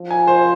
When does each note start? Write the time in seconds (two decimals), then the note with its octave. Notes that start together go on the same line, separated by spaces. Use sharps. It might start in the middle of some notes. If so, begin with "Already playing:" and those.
Already playing: F3
0.11 G#5
0.27 C5